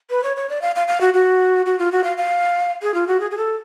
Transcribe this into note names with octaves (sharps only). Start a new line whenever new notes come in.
B4
C#5
C#5
D5
F5
F5
F5
F#4
F#4
F#4
F4
F#4
F5
F5
G#4
F4
F#4
G#4
G#4
A4